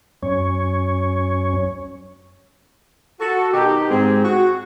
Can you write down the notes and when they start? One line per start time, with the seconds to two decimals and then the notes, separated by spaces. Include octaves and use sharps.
0.23 F#2 C#4 C#5
3.20 F#4 A4
3.52 B2 D#3 D#4 G4
3.89 G#2 C4 G#4
4.24 F#4